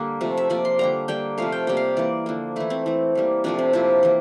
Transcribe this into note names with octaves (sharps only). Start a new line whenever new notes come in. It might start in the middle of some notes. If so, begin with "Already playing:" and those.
Already playing: D3 G3 A#3
C3 F3 A3
E5
C3 F3 A#3 D5
C6
D3 G3 A#3 A#5
D3 G3 A#3 G5
C3 F3 A3 F5
G5
C3 G3 A#3 G5
F5
E3 A#3 D5
D3 F3 A#3
E3 A3 E4
C4
E3 A3
E3 G3 A#3
C3 F3 A3 D4
C4
C3 F3 A#3 E4
E3 A#3